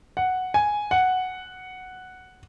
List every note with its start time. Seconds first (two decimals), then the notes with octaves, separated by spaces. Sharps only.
0.17 F#5
0.54 G#5
0.91 F#5